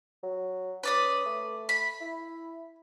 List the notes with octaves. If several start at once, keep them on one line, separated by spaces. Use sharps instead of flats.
F#3
C#4 B4 D5 D#6
A3
B5
E4